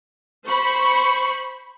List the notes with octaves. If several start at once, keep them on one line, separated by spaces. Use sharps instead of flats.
C5 B5 C#6